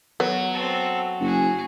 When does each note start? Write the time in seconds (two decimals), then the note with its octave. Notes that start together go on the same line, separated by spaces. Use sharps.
0.20 F#3 B3
0.53 C4 A4
1.20 F#1 F#4 G#4